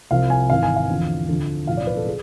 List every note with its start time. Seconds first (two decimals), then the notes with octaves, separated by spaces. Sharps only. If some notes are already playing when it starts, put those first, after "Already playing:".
0.11 C2 C3 F3 F5
0.30 G#5
0.50 G#1 G#2 E3 F5
0.63 G#5
0.76 F5
0.89 E2 D3 F3
1.28 D2 D3 F3
1.67 B1 A2 F3 F5
1.77 D5
1.87 B4
1.97 A4
2.07 G#4